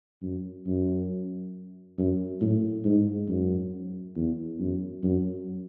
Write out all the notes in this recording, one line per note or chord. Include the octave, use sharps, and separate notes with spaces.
F#2
F#2
F#2
A2
G#2
F#2
E2
F#2
F#2